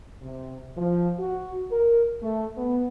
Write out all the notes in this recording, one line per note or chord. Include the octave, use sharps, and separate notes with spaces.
C3
F3
F#4
A#4
A3
B3